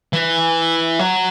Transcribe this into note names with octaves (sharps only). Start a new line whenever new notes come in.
E3
F#3